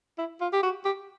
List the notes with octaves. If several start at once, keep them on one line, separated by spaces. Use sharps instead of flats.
E4
F4
G4
F#4
G4